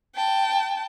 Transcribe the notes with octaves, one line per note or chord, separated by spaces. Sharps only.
G5 A5